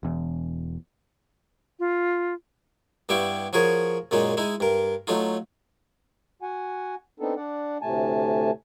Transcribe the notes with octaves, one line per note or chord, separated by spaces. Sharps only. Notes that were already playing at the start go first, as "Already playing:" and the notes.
E1 E2
F4
G2 G3 B3 E4 G5 C#6
F3 F#4 G#4 A#4 C#5
F#2 A#2 G#3 C#4 D#4
G#3 D#4 E4
G2 A#4
F#3 A3 D#4 F4
F#4 F#5 G#5
B3 C4 D4 D#4 A4
D4 D5 F#5
D2 A2 C3 A3 G#5 A5